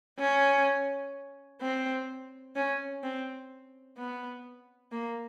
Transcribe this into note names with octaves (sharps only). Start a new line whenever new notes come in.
C#4
C4
C#4
C4
B3
A#3